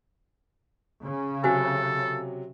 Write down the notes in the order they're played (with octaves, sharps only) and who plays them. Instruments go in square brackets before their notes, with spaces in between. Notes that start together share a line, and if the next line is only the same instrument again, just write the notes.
[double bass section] C#3
[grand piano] C3 F#3 [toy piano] F#4 C5 G#5 [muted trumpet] A4